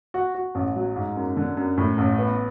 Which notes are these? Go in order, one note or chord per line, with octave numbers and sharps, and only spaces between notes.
F#4
F#4
A1
F#3
G#2
F#2
D3
F#2
A2
A1
B3